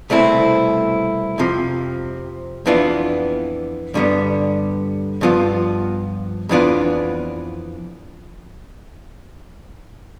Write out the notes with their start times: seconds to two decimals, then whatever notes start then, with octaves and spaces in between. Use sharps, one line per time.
0.10 C2 B2 A3 C4 E4
1.38 F2 C3 F3
2.66 F2 E3 B3 D4 F4
3.94 G2 D3 G3 B3
5.21 G2 F3 B3 F4
6.49 F2 E3 B3 D4 F4